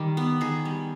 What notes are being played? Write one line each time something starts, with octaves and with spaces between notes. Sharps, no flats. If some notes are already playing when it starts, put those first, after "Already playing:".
Already playing: D#3 G3 G4
B3
D#3 G#4
G3